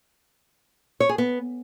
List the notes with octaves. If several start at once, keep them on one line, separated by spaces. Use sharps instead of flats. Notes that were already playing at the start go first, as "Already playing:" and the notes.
C#5
G#4
B3